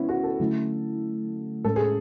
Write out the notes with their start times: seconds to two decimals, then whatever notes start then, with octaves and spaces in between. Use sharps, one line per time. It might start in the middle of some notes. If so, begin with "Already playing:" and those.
Already playing: D3 A3 B3 C#4 E4
0.09 F#4
0.24 A4
0.40 D3 F#3 A3 C#4 E4
1.64 A2 G#3 C#4 A4
1.76 G#4